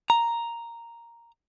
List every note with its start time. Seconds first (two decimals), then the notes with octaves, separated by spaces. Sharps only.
0.10 A#5